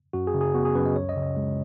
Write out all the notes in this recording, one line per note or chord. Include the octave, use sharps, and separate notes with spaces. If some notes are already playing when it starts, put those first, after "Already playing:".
F#2 F#4
G#4
C#3
G#4
B3 F#4
G#4
F#2 B4
D#5
C#2 C#5
D#5
C#3
D#5
G#3